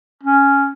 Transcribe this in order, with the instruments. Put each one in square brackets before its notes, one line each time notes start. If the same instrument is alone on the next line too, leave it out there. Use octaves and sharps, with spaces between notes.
[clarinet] C#4